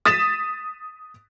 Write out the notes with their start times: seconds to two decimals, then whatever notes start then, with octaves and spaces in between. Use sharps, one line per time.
0.05 D#6 A6 B6 E7